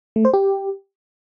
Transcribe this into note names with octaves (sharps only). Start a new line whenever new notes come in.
A3
C5
G4